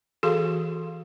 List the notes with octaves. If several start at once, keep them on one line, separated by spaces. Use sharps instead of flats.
E3 F#4 G#4 A4 F5 C6